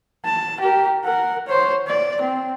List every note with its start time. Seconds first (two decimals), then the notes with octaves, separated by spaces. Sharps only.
0.25 A5
0.60 G4 A#4
1.04 A#4 F#5
1.47 C5 C#5
1.87 D5
2.21 C4